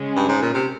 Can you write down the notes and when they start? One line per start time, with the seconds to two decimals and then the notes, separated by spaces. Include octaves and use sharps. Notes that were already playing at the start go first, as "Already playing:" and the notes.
Already playing: C#3 G#3 C#4
0.16 G2
0.28 G#2
0.42 A#2
0.54 C3